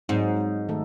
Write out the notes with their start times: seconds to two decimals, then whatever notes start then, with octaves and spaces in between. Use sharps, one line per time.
0.09 G#2 F#3 C4 D#4
0.69 D#3 A3 D#4 A4